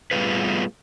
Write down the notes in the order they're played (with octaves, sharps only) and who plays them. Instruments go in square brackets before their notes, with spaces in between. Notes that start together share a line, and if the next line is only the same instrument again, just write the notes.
[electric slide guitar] G3 A3 B3 F4 G#4 B4